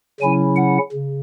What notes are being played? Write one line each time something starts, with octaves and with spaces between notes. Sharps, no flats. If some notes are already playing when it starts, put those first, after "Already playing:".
C#3 F#3 C#4 E4 G#5
F#5
C#3